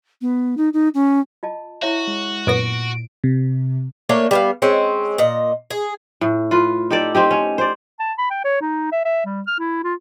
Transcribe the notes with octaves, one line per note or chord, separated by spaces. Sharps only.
B3
D#4
D#4
C#4
F4 D#5 A5
E4 F#4 C#5 E5
G#3
F#2 A#2 B3 A#6 D7
C3
A3 A#3 D4 C#5
G3 B3 F5
G#3 C4 C#4
A#2 D#5
G#4
A2
F4 B4
D#4 G4 A4 D5
C4 D#4 G4
C#4
C5 D5
A5
B5
G5
C#5
D#4
E5
E5
G3
F6
E4
F4